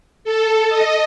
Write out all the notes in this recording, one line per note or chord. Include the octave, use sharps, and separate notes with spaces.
A4
D#5